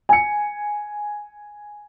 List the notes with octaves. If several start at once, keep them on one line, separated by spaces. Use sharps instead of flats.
G#5 C#7